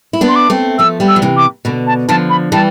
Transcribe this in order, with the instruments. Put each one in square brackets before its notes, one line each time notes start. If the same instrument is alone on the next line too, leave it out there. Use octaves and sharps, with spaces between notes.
[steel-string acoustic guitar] E4
B3 D4
[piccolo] C6
D6
[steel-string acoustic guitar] A3 C4
[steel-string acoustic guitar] F3 A3 [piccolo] E6
[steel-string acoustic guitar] G3 B3
[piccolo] E6
[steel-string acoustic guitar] F3
C3 E3
[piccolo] D6
[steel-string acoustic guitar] B2 D3
[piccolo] A5
[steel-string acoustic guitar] D3 F3 [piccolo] A5
[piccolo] B5
[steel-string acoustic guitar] E3 G3 [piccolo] A5